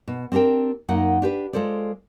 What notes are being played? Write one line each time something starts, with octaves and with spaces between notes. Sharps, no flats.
B2
C4 D4 G4 A#4 G5
F#2 A#3 D#4 F#5
D4 G4 B4
G#3 F4 A4 C5 D5